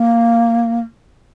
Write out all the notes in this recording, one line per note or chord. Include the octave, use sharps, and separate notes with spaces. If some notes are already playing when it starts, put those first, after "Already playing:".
Already playing: A#3